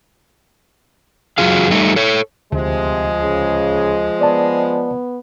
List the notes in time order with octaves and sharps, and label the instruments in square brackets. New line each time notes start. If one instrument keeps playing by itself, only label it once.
[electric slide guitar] F#2 F#3 G3 F4 G#4 F5
G3 A3 D#4
A4 C#5
[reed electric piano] D2 [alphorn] C3 [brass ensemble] F3 G#3
[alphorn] C#3
[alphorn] B3 [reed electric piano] D5 A5